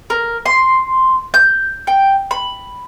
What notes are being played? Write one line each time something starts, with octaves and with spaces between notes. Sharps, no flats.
A#4
C6
G6
G5
B5